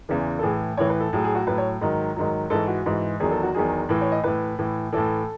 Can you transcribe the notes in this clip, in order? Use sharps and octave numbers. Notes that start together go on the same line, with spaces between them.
E2 C#3 E3
A4
A2 E3 G#4
A2 E3 C#5
B4
A4
A2 F#3 G#4
G#4
F#4
A2 F#3 B4
C#5
G#2 D#3 F#3
G#2 D#3 F#3
G#2 E3 A4
F#4
G#2 E3
E2 D#3 F#3 G#4
A4
F#4
E2 D#3 F#3 G#4
A2 E3
C#5
D#5
A2 E3 B4
A2 E3
A2 E3 A4